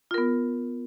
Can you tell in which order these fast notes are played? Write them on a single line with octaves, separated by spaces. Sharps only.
F4 A#4 B3